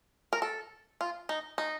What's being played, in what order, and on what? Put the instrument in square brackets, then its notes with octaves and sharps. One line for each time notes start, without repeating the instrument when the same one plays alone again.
[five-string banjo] A#4
A4
F4
D#4
D#4